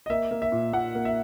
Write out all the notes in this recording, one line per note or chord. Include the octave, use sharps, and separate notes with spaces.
D#5
A#3 E5
A#3
E5
A#2
A#2 F#5
A#3
E5